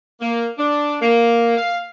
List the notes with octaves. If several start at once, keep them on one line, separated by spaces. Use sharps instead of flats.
A#3
D4
A#3
F5